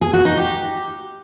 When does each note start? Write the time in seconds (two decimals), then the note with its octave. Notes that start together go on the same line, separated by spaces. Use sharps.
0.01 G#4
0.13 F#4
0.25 D#4
0.37 G4